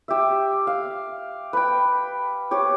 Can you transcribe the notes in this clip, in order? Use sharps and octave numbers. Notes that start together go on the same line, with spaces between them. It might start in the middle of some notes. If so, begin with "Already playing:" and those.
G4 E5
F5
B4 G5
G4 C#5